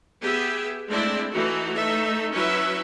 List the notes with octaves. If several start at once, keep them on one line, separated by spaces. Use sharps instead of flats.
B3 G4 G#4 E5
G#3 A3 C4 D4 E4 D5
E3 A3 D#4 F#4
A3 D#4 A4 E5
F#3 C#4 E4 B4 E5